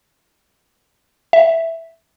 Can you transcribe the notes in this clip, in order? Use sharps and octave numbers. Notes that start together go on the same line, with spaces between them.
E5